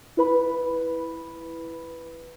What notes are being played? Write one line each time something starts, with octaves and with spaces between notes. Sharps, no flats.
E4 B4 B5